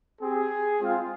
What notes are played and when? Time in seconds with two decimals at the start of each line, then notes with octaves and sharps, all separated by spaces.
0.20 C4 G4 G#4
0.79 G#3 C4 F4